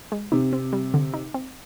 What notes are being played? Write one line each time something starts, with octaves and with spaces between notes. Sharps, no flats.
G#3
C3 D#4
C4
G3
D3
D#4
C4